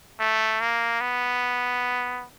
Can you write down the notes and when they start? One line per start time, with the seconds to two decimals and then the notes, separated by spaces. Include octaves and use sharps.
0.20 A3
0.60 A#3
1.01 B3